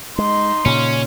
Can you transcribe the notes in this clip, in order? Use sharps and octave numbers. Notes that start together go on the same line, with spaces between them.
G#3 D#4 C6
A#2 C#3 C#4